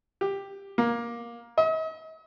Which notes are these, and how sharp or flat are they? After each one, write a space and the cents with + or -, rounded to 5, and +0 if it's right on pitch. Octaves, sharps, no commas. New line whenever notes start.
G4 +10
A#3 +15
D#5 +45